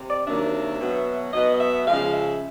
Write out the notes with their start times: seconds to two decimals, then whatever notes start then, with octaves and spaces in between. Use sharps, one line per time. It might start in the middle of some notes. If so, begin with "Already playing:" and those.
Already playing: C3
0.09 D5
0.27 C3 D#3 F#3 A#3 D4 E5
0.80 B2 F#3 B3
1.33 B2 F#3 B3 D#5
1.54 D#5
1.61 E5
1.86 C#3 F3 G#3 F5
2.13 E5